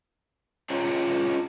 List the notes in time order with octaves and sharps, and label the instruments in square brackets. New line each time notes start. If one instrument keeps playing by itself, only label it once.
[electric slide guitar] C#4 F4 G#4 C#5 G5 A#5